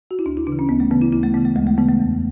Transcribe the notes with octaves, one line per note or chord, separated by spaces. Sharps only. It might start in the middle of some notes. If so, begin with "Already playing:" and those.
F#4
E4
D2 D4
E4
C#3 D4
E3
C#4
D2 B3
A3
C#3 E3 B3
E4
D2 E4
A3
C#3 E3 B3
A3
D2 G#3
A3
C#3 E3 B3
A3
E2